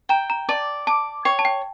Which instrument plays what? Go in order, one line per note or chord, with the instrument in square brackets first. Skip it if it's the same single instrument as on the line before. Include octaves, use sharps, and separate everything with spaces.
[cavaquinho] G5 [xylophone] A#5
[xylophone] A#5
[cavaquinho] D5 [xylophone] A5
[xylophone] A5 [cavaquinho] D6
[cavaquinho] C#5 [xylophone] G5
[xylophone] A5
G5